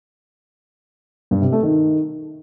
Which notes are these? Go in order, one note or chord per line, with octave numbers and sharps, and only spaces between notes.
G2
C3
A3
D#3